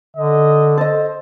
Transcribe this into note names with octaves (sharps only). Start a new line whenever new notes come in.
D3 D#5
A4 C5 D#5